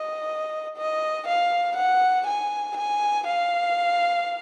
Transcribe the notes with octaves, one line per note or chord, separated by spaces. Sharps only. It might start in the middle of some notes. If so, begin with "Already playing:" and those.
Already playing: D#5
D#5
F5
F#5
G#5
G#5
F5